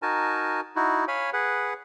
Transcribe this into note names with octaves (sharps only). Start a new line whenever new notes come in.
D#4 F#4 A#4 G#5 A5
D#4 E4 F#4
C#5 F5 G#5 B5
G#4 B4 F#5